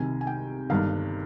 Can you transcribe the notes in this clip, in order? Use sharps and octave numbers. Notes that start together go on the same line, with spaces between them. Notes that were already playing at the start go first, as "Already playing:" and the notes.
Already playing: C2 C3 D#3 G#5
G#5
G5
G1 G2 D#3 F5